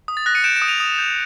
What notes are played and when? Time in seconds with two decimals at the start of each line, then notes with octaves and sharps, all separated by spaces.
0.08 D#6
0.17 A6
0.26 F#6 A#6
0.35 C#7 D#7
0.44 G6 D7 E7
0.56 D7 E7
0.62 D#6
0.68 D#7 F7
0.80 D#6
0.99 G6